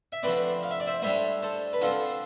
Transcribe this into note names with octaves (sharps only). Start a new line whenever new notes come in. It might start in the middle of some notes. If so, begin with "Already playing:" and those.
E5
D3 F3 A3 C4 B4 D5
F5
E5
D5
C5 E5
A2 G3 D4 C5 E5
A4 C5
B4
D3 F3 C4 F4 A4